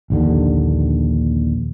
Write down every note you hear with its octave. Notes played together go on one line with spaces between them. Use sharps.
A#1 D#2 D3